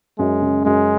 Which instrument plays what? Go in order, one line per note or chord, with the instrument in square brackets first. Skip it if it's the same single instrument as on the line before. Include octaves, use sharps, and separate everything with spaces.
[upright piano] F#2 [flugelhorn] G#3
[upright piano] C#3
[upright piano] F#2 [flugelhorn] G#3